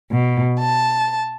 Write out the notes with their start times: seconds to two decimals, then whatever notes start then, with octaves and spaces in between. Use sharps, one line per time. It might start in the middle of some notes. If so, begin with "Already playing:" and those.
0.11 B2
0.59 A5